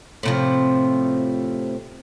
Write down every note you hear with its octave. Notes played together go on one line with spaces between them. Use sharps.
A2 C3 F3